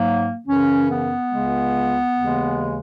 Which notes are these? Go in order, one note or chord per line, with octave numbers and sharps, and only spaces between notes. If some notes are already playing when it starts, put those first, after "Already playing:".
Already playing: G#2 F#3 A#3
F#2 C#3 E3 C#4
B3
C#2 C#3 G#3
D#2 C#3 E3 G#3